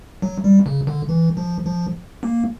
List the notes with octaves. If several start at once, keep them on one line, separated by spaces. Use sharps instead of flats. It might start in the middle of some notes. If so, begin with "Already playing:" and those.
F#3
G3
C#3
D3
E3
F3
F3
A#3